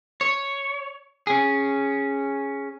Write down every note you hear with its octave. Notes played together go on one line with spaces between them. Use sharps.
C#5
C#4 G#4